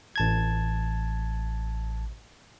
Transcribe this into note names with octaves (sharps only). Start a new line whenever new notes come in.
A1 A5 G#6